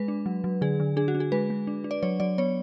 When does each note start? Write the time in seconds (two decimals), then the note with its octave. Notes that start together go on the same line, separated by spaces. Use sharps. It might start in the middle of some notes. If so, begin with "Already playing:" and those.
Already playing: G#3 B4
0.08 D4
0.26 F#3
0.44 F#3
0.61 D3 G#4
0.80 D3
0.96 D4 G#4
1.08 F#4
1.15 D4
1.20 G#4
1.32 G#3 B4
1.50 G#3
1.67 D4
1.84 D4
1.91 D5
2.03 F#3 C#5
2.20 F#3 D5
2.38 B3 C#5